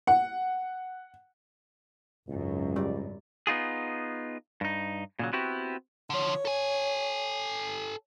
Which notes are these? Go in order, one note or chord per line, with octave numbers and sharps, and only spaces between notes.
F#5
G#1 C#2 F#2
G3 D5
B3 D#4 F4 G#4
G2 D#4
A#2 C#3 F#3
B3 C4 E4 F#4 G4
D3 F3 C#5
A4 G#5